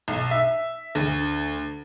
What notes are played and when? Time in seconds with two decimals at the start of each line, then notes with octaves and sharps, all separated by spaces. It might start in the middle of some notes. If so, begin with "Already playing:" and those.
0.08 B1
0.31 E5
0.95 D2